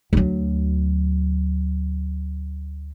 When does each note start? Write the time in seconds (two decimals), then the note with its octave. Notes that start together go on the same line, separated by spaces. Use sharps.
0.13 D2 F#3